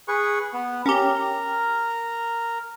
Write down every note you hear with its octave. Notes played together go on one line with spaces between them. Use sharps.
G#4 B4 C#6
B3
C#4 G4 A#4